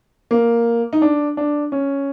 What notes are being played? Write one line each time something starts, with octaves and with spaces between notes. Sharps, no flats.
A#3
D#4
D4
D4
C#4